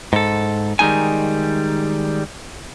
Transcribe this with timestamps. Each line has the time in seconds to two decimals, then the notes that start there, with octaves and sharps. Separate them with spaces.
0.13 G#2 A4
0.79 D#3 G3 G#3 D#4 G#5